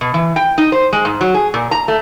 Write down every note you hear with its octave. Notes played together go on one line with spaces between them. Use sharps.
B2
E3
G5
D#4
C5
G#3
G#2
F#3
G#4
A#2
A#5
A3